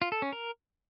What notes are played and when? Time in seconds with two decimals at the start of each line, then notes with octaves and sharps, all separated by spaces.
0.02 F4
0.12 A4
0.22 C#4
0.33 A#4